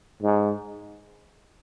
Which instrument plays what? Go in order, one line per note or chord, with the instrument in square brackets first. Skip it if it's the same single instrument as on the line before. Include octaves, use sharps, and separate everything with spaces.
[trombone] G#2